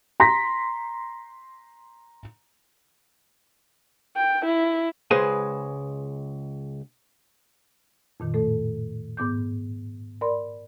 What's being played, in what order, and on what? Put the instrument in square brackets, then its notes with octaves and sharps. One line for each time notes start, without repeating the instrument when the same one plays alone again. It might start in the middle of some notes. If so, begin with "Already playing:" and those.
[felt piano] A#5 C6 A#6 B6
[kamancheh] G5
E4
[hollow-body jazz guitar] C#2 G#3 G#4 B4 C5 G#5
[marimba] F2 A#2 D#3
A2 A3 A4
G#2 B3 D6 G6
A#4 D5 B5 C6